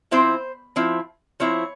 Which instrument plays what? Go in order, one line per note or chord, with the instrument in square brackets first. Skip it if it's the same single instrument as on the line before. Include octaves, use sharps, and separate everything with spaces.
[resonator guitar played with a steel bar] F3 C4 E4 C5
F3 C4 E4
F3 C4 E4 C#5